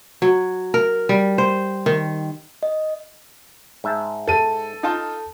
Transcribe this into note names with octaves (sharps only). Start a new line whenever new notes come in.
F#3
A#4
G3
C5
D#3
D#5
G#2 E5 A5
A4 D#7
D#4 F4 A5